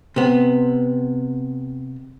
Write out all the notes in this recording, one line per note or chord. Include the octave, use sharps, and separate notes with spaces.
C3 B3